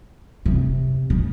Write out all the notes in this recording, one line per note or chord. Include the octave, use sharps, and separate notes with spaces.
C3
C#3